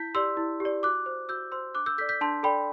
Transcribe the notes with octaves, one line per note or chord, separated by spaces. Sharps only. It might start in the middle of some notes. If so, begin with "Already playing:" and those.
Already playing: E4 G6 B6
G4 D5 C6 E6
E4
G4
D5
F#4 D6 F#6
C5
F#4 E6 G6
C5 C6 E6
D4 D6 F#6
E6 G6
A4 D5 G6 B6
G6 B6
D4 A5 C6
A4 D5 G5 B5